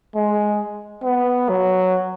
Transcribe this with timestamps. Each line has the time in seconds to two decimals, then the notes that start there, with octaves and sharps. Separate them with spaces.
0.15 G#3
1.04 B3
1.49 F#3